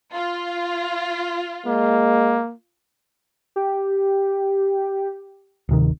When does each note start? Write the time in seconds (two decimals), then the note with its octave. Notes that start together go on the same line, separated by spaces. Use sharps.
0.12 F4
1.66 G#3 A#3
3.56 G4
5.69 D1 C3 D#3